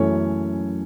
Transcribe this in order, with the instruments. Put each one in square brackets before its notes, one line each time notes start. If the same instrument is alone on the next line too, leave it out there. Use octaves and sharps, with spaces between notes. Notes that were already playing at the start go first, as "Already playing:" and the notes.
Already playing: [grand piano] F#2 E3 A3 C#4 C#5